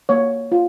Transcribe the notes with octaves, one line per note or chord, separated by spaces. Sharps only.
A#3 C#5
F4